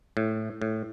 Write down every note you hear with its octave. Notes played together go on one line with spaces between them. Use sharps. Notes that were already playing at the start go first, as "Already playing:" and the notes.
A2
A2